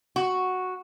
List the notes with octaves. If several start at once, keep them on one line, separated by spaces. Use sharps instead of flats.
F#4